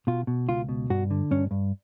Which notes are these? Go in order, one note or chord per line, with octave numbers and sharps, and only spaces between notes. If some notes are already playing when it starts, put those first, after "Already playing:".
B2 F4
B2
C#2 F4
B2
G2 F#4
D3
G2 C#4
G2